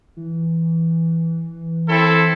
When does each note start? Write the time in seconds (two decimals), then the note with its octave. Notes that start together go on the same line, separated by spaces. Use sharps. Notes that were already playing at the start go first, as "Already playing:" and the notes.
0.17 E3
1.89 C4 E4 A4